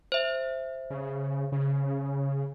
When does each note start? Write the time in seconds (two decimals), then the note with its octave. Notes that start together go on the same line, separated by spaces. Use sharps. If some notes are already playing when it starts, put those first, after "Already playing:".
0.12 C5 E5
0.90 C#3
1.52 C#3